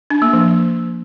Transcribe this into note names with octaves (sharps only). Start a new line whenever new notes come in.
D4
A#3
F3